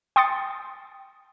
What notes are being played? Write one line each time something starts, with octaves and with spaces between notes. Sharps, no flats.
G5 C6 D#6 A6 C#7